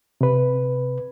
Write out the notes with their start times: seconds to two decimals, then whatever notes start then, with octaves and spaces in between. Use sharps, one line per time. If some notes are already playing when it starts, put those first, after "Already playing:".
0.21 C3 B4